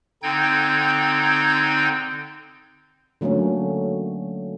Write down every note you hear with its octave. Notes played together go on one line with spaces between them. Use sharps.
D3 C4 D#4 G5 G6 G#6
D3 F#3 A3 A#3 C#4